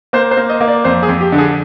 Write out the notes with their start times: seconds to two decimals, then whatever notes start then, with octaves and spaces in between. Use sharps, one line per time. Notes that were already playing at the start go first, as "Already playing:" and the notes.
0.13 A#3 C5
0.31 C5
0.37 A#3
0.50 D#5
0.61 A#3
0.67 D5
0.85 F2 C5
1.03 G#4
1.09 F2
1.21 G4
1.32 D3
1.38 G#4